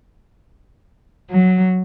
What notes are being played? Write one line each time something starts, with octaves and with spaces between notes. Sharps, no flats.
F#3